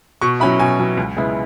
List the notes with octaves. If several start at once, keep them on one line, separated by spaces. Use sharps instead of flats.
B2 C#6
F#3 C#4 E4 B5
B2 G#5
F#3 C#4 E4
C#2
C#3 G#3 B3 E4